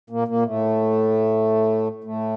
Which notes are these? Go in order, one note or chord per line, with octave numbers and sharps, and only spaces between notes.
A#2 A#3
A#2 A#3
A2 A3
A2 A3